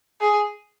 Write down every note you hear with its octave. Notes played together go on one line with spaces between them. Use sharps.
G#4